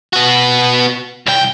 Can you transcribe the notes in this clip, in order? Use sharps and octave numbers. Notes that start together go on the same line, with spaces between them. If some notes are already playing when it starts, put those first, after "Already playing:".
B3 F#4
C2 G5